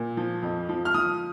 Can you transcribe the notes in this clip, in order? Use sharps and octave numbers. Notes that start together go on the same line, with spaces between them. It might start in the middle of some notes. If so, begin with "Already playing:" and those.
Already playing: A#2
F3
F2
F3
F6
F3 D#6